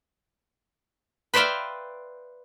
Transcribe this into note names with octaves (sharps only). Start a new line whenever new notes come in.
B4 C5 D5 E5 F5 G5